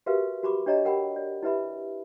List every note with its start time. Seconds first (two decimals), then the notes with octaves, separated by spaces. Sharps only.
0.06 F#4 G4 A#4 B4 E5 F5
0.43 F#4 G4 B5 C#6 D6
0.66 D4 G4 C#5 D#5 A#5
0.85 G4 A#4 F#5 G5 B5
1.16 D5
1.43 E4 G4 B4 E5 B5